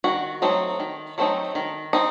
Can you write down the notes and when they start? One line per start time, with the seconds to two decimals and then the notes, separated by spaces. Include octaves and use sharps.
0.04 D#3 F#4
0.42 F#3 A3 C4 D#4
0.80 D#3
1.18 F#3 A3 C4 D#4
1.55 D#3
1.93 C4 D#4